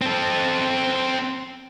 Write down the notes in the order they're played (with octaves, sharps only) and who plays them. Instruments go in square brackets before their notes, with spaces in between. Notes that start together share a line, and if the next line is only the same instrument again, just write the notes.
[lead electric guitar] C4 A4